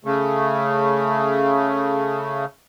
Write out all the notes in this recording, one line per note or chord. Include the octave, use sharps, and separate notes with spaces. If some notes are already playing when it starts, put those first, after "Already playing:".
C#3 A3